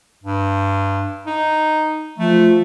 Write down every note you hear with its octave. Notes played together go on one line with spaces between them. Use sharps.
G2
D#4
F3 A3